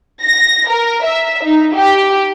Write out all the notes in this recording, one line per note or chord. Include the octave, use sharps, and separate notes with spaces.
A#6
A#4
E5
D#4
G4